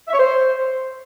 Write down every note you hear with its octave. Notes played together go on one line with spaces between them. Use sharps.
E5
C#5
C5